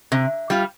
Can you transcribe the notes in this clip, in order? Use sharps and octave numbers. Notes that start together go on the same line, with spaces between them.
C3
G3 F4